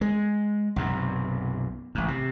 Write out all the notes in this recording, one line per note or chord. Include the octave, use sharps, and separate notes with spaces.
G#3
B1 F#2 C3
A1 G#2
C3